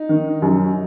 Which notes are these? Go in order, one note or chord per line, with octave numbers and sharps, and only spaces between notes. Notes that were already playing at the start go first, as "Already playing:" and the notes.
Already playing: D#4
D#3
F#2